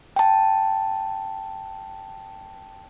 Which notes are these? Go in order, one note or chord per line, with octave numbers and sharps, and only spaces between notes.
G5 A5